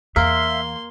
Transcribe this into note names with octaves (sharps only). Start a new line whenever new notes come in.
E2 A#3 E5 F5 C6